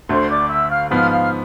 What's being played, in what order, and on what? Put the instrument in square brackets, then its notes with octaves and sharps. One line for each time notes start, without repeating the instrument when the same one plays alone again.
[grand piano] D2 D3 A3 [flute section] C5 C6
[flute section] D5 D6
E5 E6
F5 F6
[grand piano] G#2 F3 B3 [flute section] F5 F6
[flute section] F5 F6